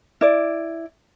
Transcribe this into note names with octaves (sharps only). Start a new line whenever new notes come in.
E4 D5